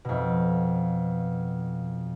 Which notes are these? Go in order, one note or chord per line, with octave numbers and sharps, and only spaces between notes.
F2 B2